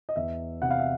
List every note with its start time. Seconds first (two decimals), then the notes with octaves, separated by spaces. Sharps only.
0.09 D#5
0.16 E2 E5
0.62 C3 F#5
0.71 F5
0.80 E5